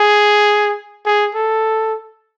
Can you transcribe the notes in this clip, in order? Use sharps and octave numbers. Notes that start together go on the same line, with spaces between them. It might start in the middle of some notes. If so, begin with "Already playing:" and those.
Already playing: G#4
G#4
A4